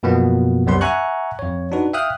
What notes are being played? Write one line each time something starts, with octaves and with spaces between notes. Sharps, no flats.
F#2 B2 F3 A#3 B3
C2 F#2 G3 B3 B4 C6
E5 F#5 G#5 A#5 C#6 F#6
F2 C#5
D4 D#4 F#4 B4
E5 F5 G5 D#6 F6 F#6